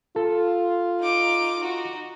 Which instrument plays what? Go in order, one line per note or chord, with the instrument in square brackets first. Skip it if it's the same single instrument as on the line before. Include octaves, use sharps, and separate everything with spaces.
[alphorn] F4 [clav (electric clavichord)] A4
[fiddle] D#4 D6
D#4 F#4